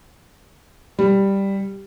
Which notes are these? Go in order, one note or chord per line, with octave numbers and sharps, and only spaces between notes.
G3